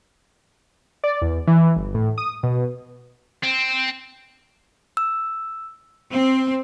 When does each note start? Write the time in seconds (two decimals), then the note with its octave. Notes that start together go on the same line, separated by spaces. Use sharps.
1.04 D5
1.22 E2
1.47 E3
1.76 G1
1.94 A2
2.18 D#6
2.43 B2
3.44 C4
4.97 E6
6.11 C4